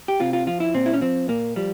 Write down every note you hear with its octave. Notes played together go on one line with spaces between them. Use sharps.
G4
C3 F4
F4
F3 F4
E4
A#2 C4
E4
C#4
F3 C4
A#2 A#3
F3 G3